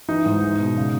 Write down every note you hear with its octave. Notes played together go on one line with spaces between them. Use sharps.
E3 D#4
G#2
G#3
B2
C#3